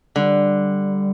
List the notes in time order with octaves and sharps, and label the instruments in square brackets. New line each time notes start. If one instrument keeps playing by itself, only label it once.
[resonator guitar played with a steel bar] D3 [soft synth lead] G3